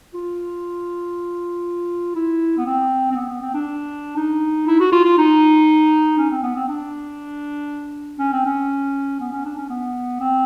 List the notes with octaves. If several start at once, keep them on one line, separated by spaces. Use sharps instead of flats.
F4
E4
B3
C4
C4
B3
B3
C4
D4
D#4
E4
F#4
F4
F4
D#4
C#4
C4
B3
C4
D4
C#4
C4
C#4
B3
C#4
D4
C#4
B3
C4